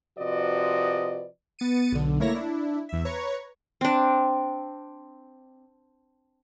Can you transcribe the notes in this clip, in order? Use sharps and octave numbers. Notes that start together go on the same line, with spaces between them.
C3 F3 F#4 B4 D5 D#5
B3 A6 C#7 D#7
B1 D3
A3 A#3 E4 C#5 A#6
D4 E4
E2 E5
B4 C#5 A#5 C#6
C4 D4